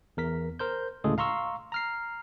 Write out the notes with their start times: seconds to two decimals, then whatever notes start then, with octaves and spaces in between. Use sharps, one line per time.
0.17 E2 A#4 B6
0.59 A#4 C5 G6
1.04 D2 A2 C#3 G#3 G#4 A4
1.18 F5 A#5 C6 C#6 E6
1.72 A#5 F6 C7